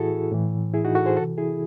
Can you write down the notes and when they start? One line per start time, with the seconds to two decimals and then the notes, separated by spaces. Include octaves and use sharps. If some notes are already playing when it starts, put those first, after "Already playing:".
Already playing: A2 E3 E4 F#4 G#4 A4
0.31 A2 E3
0.74 E4 G#4
0.85 D#4 F#4
0.95 F#4 A4
1.06 G#4 C5
1.16 C3 E3 F#4 A4
1.38 E4 G#4